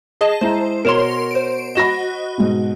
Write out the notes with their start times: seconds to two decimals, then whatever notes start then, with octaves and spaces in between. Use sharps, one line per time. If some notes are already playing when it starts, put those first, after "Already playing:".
0.21 G#4 D#5 A5
0.41 G#3 E4 C5 A#5
0.85 B2 A#4 C#5 C6 E7
1.31 C5 D7
1.75 F#4 D#5 B5 A#6 E7
2.38 G#2 B2